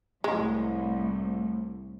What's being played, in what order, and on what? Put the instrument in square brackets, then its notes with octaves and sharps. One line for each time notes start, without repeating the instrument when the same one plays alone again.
[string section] C2 A2 [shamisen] G#3